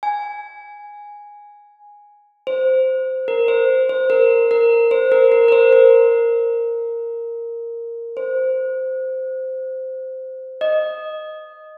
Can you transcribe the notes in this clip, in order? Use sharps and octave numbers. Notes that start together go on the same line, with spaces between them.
G#5
C5
A#4
C5
C5
A#4
A#4
C5
A#4
A#4
A#4
C5
A#4
C5
D#5